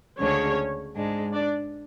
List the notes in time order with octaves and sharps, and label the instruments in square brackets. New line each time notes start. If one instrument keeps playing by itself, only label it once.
[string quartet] D2 C#3 G#3 D4 [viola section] C#4 C#5
[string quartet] G#2 G#3 D4
[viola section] D4 D5